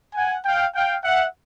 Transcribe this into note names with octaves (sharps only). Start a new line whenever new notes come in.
F#5 G#5
F5 G5
F5 G5
E5 F#5